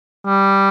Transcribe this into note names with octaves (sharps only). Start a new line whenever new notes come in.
G3